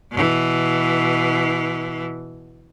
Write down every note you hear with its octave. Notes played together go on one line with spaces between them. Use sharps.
B2 E3